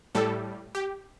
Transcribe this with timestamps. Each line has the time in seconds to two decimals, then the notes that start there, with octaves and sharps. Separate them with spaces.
0.15 A2 G3 A4
0.75 G4